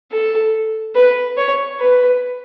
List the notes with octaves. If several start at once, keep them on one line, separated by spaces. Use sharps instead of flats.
A4
B4
C#5
B4